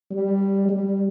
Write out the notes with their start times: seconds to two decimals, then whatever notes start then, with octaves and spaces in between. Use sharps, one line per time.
0.11 G3
0.69 G3